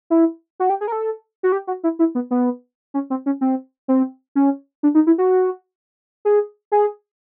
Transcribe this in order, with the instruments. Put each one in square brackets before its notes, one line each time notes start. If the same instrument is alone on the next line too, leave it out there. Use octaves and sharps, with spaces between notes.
[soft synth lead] E4
F#4
G4
G#4
A#4
A4
F#4
G4
F#4
E4
E4
B3
B3
C#4
C4
C#4
C4
C4
C#4
D4
D#4
E4
F#4
G#4
G#4